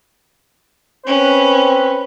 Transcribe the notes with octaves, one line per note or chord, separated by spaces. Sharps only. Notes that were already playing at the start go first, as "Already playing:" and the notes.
C4 C#4 B4